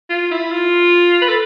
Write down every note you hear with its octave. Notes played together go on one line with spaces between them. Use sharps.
F4
E4
F4
B4
A4